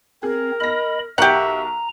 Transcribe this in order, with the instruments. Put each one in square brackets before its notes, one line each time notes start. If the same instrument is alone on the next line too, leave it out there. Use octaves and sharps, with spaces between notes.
[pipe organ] C4 [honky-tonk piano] G#4 [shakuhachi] A#4
[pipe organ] D#5 B5 [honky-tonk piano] F6 A#6
[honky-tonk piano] B1 A#4 C#6 [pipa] G4 F#5 [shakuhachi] E5 [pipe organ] A#5